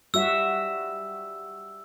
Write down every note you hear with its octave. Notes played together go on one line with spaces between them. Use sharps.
G3 F#4 E5 E6